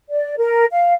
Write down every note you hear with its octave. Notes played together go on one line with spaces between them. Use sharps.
D5
A#4
F5